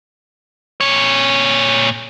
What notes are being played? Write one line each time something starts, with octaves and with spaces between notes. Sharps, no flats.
A#2 C#5